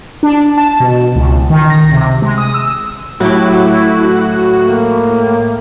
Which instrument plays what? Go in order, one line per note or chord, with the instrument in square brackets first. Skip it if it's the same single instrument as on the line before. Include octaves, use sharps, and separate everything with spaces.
[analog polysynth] D4
A5
B2
C#2
D#3
A#6
C3
G#3
D#6
E6
[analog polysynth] A2 [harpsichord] F#3 G4 [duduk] E4 [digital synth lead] F#4
[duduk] A#3